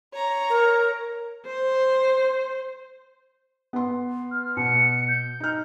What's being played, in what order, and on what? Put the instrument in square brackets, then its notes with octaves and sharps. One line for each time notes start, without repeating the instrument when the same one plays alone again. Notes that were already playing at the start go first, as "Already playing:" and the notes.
[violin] C#5 A#5
[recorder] A#4
[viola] C5
[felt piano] B3 C6
[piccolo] F6
[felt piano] B2 [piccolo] C#7
[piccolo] G6
[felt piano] D#4 F6